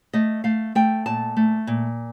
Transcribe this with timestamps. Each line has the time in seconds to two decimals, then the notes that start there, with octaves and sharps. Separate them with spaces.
0.13 A3 D#5
0.44 A3 F5
0.75 A3 G5
1.06 A#2 A5
1.37 A3
1.67 A#2